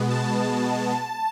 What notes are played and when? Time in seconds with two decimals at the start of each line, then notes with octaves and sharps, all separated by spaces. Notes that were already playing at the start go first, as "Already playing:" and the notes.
Already playing: B2 G#3 B3
0.10 A5